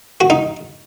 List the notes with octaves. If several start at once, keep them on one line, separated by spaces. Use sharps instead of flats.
F#4
D#4